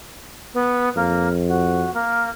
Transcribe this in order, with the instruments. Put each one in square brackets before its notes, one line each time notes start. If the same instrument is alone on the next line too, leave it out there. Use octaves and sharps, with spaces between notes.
[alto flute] B3
[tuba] F2 [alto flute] A#3
[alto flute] F#4
A#3